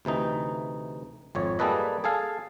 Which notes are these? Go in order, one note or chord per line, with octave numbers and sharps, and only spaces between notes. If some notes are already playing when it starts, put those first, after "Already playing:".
D2 C3 E3 D#4
G#1 F2 C#5
G3 A#3 G#4 A4 B4 D#5
G#4 A4 F5 G#5